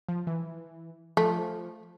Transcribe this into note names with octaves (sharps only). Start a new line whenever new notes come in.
F3
E3
F3 A3